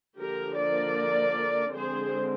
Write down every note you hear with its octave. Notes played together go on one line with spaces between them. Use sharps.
D3 F3 A#3 D4 G4 A#4
A#4 D5
D3 G#3 C4 G#4 C5